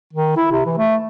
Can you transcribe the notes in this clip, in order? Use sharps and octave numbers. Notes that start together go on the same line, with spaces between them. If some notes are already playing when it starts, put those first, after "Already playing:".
D#3
E4
C3
E3
A3